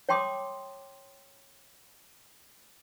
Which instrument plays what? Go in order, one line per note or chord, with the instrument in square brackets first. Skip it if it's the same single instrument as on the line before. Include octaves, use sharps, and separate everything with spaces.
[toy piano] C#5 G5 A5 C6 D6 D#6